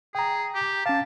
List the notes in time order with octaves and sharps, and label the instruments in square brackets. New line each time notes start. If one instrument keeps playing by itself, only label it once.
[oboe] G#4 [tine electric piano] G5 A#5
[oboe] G4
[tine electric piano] C#4 F5 [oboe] A5